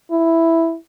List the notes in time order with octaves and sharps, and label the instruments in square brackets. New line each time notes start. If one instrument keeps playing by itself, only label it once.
[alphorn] E4